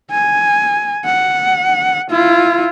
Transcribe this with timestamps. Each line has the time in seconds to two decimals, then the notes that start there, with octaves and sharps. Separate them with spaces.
0.11 G#5
1.05 F#5
2.11 E4 F4